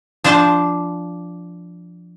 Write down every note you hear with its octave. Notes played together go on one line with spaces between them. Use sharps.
F3 D4 C5 A5